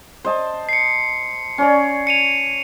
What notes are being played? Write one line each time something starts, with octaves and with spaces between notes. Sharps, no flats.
C5 D#5 A5
C7 C#7
C#4 C#5 D5
C#7 D#7 F7